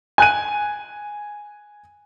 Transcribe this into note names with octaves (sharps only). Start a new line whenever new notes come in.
G#5 F#6 D#7